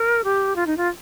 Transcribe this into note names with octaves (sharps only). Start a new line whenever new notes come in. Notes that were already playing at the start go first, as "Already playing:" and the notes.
Already playing: A#4
G4
F4
D#4
F4